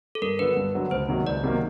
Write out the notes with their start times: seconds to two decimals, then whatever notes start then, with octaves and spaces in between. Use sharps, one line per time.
0.15 A4
0.22 G2 A#4
0.39 D3 F#3 B3 B4
0.57 G2
0.74 D3 F#3 B3
0.91 C#2 C5
1.09 C3 D#3 F#3 A#3
1.26 C#2 D5
1.44 C3 D#3 F#3 A#3